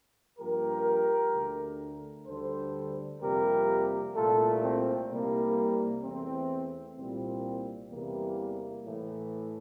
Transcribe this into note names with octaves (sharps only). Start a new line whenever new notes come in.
G2 F3 A#3 G4 A#4
D2 D3 A3
D2 D3 G3 A4 C5
F2 C3 G3 A#3 G4 A#4
C2 A#2 A3 F4 A4
C4
C2 C3 G3 A#3
E2 E3 A3 C4
C2 A#2 G3 A#3 C4
E2 C3 E3 G3 A#3
A2 E3 A3